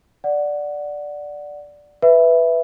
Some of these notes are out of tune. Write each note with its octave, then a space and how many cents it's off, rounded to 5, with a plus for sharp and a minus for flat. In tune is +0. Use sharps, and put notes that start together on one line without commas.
D5 +0 F#5 +0
B4 +0 E5 +0